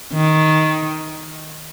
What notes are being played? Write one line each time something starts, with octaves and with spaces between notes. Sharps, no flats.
D#3